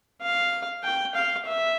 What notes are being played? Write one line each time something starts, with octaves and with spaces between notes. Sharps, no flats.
F5
G5
F5
E5